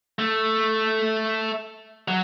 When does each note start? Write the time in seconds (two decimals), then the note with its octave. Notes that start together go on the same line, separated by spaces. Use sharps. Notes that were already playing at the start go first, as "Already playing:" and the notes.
0.19 A3
2.08 F#3